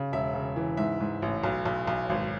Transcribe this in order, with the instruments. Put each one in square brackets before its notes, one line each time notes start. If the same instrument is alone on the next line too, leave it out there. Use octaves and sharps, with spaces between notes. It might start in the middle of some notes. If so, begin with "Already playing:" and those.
Already playing: [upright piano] C#3
E1 E5
C#3
E3
G#2 E5
G#2
A1
B1
B1
B1
G#1